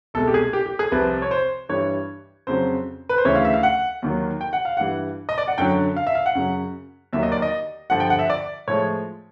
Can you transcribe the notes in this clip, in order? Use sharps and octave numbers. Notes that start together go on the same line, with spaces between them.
C2 B2 G#3 A4
G4
G#4
G4
G4
G#4
C2 C3 F3 B4
C#5
C5
G2 E3 G3 C#5
F2 C#3 F#3 C5
B4
C5
D2 C#3 E3 C#5
F5
E5
F5
F#5
D#2 D#3 F#3
G5
F#5
F5
G2 E3 G3 F#5
D#5
D5
F#5
F#2 D3 F#3 G5
F5
E5
F5
F#5
F#2 C#3 F#3
D#2 D#3 F#3 E5
D#5
D5
D#5
G2 D3 F3 F#5
G5
F#5
E5
D5
A2 F3 G#3 C#5